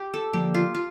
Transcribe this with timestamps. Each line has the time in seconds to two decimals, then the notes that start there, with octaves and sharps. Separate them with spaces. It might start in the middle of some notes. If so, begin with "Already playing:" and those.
Already playing: G4
0.14 A4
0.33 D3 F3 A#3 D4 G4
0.54 F4
0.75 F4